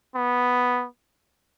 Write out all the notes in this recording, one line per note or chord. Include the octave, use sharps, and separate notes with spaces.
B3